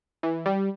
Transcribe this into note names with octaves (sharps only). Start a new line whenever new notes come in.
E3
G3